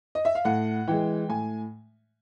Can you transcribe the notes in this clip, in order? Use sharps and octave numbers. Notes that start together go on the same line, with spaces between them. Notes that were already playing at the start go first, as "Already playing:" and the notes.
D#5
E5
F5
A2 F#5
E3 G#3 G5
A2 G#5